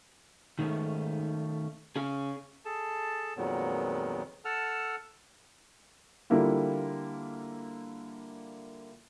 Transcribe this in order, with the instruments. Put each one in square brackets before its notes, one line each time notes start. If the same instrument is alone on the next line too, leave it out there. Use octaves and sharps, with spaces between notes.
[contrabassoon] G#2 [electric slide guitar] D#3 A3 C#4
[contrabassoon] C#3 [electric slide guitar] C#4 G#4
[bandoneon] G#4 A4 A5
F2 A#2 D#3 F#3 G#3 B3
A4 F#5 A5 E6 F6
[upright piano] D3 G3 A#3 E4 F4